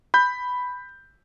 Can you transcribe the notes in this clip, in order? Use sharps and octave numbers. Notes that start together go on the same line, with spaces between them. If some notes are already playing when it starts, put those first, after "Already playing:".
B5 G6